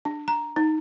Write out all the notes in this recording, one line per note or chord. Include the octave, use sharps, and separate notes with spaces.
D4
A#5
D#4